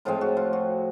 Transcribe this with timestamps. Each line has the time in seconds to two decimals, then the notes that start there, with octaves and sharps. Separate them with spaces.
0.05 A2 F3 G#3 C4 F4
0.21 F#4
0.37 F4
0.53 F#4